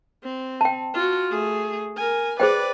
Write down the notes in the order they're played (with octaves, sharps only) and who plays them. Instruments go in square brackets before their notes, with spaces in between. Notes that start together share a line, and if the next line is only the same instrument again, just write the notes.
[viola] C4
[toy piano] G5 A5
[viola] F4 F#4
A3 G#4
A#4 G#5
[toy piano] G#4 C5 G5 [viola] B4 D5